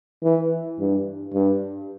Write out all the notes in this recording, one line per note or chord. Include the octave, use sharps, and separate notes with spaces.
E3
G2
G2